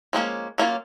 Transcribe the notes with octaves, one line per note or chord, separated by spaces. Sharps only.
F3 G#3 A#3 C#4
F#3 A#3 C#4 F4